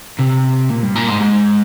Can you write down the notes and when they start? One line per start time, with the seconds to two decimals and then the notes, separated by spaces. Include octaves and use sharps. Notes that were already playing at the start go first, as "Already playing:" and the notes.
0.19 C3
0.70 A#2
0.83 G2
0.96 A#2
1.08 G#2
1.21 G#2